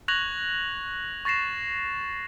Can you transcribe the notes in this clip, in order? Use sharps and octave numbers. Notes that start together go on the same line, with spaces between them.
C#6 F#6 G#6 A#6 F7 F#7
C#6 A6 A#6 C7 E7